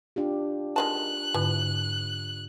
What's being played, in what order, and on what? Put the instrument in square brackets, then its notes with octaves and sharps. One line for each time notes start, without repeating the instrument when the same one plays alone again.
[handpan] D4 F4 G4
[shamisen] D#3 G#3 A5 [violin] F#6
[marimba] G#2 D3 [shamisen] E3